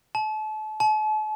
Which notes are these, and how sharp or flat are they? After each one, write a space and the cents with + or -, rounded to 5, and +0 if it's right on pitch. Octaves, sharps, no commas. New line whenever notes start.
A5 -35
A5 -40